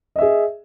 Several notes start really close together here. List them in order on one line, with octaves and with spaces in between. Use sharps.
D#5 E5 G#4